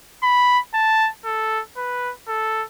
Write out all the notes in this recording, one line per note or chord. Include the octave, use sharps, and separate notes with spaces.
B5
A5
A4
B4
A4